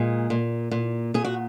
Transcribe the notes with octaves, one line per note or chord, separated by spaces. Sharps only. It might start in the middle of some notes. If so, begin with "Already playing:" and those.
Already playing: A#2 G#3 G#4
A#2
A#2
A#2 G#4
F#4